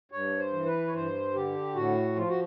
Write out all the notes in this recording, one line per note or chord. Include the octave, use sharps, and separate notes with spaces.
G2 C#5
C5
E3
B4
C#5
G2 C5
D3 G4
A2 F#4
F3 F4
F#4